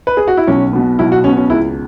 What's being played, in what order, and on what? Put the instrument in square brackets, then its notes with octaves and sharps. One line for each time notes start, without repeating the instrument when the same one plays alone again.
[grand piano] B4
G#4
F#4
E4
[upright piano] B1 [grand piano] C#4
[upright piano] B2 B3
[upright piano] B1 [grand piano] E4
[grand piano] F#4
[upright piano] B2 B3 [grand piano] C#4
[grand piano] C#4
[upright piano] C#2 [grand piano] E4